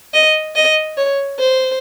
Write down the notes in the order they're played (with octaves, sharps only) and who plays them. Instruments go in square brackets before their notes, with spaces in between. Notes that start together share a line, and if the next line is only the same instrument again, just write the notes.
[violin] D#5
D#5
C#5
C5